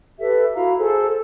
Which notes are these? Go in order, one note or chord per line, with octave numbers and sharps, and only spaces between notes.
G4 A4 B4 E5
E4 F#4 F5 A#5
G#4 A4 C5